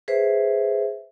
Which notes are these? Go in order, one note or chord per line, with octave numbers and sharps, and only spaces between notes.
G#4 B4 C5 E5